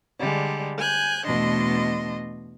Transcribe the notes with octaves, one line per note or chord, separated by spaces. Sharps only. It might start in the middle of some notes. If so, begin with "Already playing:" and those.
D3 G3 G#3
G#5 F#6 G6
E2 B2 A3 D4 D#5 C6